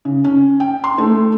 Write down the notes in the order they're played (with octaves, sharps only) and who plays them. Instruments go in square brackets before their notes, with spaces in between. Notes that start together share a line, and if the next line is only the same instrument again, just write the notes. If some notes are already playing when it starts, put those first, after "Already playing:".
[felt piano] C#3
C#4
G5
C6
A3